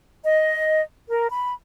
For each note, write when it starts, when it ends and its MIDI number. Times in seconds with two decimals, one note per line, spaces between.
0.23 0.80 75
1.09 1.27 70
1.31 1.50 83